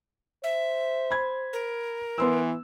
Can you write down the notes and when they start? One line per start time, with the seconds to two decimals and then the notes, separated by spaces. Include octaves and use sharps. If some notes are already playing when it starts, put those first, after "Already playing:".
0.44 C5 E5
1.11 B5 G#6
1.53 A#4
2.18 E3 B3 C6 E6